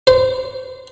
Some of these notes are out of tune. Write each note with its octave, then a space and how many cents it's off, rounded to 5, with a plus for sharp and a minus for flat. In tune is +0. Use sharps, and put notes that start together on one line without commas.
C5 -25